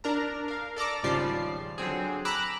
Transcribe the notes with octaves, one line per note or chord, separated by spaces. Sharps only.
D4 A#4 A#5
A#4 F5
A4 D5 A#5 D6
G#1 C#3 F3 G3 D5 C7
D3 F#3 C4 G#4
A#5 B5 D6 E6 F#6